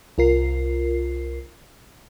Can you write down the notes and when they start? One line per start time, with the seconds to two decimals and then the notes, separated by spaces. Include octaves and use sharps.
0.18 C2 F4 A#4 C7